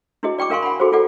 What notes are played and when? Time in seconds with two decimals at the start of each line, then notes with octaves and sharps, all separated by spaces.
0.23 D4 E4 F#4 G#4 D#5
0.38 D5 G5 C#6 D6
0.50 D4 A#4 F5 G#5 C6 C#6
0.63 F#5 G#5 B5
0.80 F#4 G#4 A4 C5
0.92 E4 F4 A4 D5 F#5